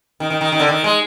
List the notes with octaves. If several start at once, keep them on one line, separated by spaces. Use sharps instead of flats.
D#3
D#3
D#3
D#3
D3
D#3
G#3